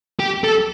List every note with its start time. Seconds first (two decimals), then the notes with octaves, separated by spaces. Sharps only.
0.19 G4
0.44 A4